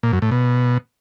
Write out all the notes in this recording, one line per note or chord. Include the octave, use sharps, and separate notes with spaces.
A#2
F#2
A2
B2